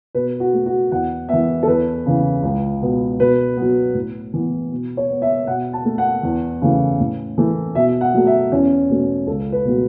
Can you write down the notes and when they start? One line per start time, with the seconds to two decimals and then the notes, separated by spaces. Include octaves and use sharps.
0.15 B2 B4
0.40 F#4
0.54 A3
0.66 F#4
0.92 E2 F#5
1.29 E3 B3 E5
1.63 A4
1.67 E2 B4
2.06 C#3 E3
2.43 C#2
2.82 B2 B3
3.20 B2 B4
3.57 F#3 B3
3.95 A2
4.34 E3 B3
4.72 B2
4.97 C#5
5.10 B3
5.22 E5
5.47 B2 F#5
5.73 A5
5.85 A3
5.98 F#5
6.23 E2
6.61 C#3 E3 A3
7.00 A2
7.38 E3 A3
7.75 B2 E5
8.01 F#5
8.14 F#3 A3
8.27 E5
8.52 E2 C#4
8.90 B2 A3
9.27 C#2 A4
9.52 B4
9.65 B2 F#3 A3